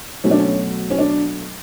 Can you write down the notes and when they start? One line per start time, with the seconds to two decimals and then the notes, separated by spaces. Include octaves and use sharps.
0.24 B2 F#3 A3 C#4
0.31 D4
0.39 C#4
0.91 C#4
0.99 D4